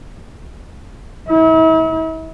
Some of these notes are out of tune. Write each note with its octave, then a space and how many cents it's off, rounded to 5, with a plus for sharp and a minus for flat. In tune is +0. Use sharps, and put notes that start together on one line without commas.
E4 -40